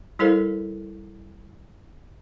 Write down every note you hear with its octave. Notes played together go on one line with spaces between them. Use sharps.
G3 E4 A4 A#4 C5 F5